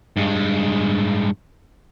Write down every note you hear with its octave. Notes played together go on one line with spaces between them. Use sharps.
G2 G#3